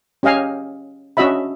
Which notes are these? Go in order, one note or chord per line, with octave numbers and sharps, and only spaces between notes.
C#4 G4 D#5 F5 G#5
C#4 D4 F#4 D#5 E5 B5